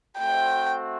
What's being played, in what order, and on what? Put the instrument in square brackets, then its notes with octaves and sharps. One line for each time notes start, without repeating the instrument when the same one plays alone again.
[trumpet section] A3 C4 F#4 C5 E5 [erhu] G5